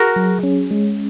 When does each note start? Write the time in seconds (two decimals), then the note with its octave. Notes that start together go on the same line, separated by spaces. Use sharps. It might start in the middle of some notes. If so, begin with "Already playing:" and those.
Already playing: F#4 G#4 A#4
0.16 F#3
0.43 C#4
0.71 G#3